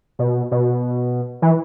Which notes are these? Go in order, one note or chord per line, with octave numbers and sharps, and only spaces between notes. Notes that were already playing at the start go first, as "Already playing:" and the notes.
B2
B2
E3